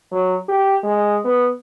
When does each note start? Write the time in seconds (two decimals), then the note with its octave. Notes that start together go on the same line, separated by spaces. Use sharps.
0.12 F#3
0.48 G4
0.83 G#3
1.25 B3